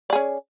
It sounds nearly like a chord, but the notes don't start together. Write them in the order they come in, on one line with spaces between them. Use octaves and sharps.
D5 G#4 C#4